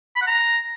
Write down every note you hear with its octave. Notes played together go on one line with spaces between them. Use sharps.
B5
F#5
A#5